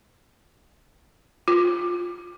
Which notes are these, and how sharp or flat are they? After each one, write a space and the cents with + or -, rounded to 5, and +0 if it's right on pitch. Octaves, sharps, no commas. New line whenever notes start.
F4 +15